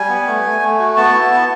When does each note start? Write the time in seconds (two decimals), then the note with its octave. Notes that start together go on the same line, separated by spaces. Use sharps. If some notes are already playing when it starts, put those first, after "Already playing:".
Already playing: G3 G#5
0.09 B3
0.27 A3
0.44 A3
0.61 A3
0.79 F#4
0.96 B3 A5
1.14 E4
1.31 B3